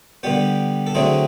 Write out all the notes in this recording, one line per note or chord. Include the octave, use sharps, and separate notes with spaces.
D3 G3 B3 G4
A4
D3 F#3 A3 C4 G#4